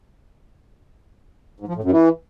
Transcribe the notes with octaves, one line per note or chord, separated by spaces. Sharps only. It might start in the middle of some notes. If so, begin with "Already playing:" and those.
G#2
F3
A2
F#2
E3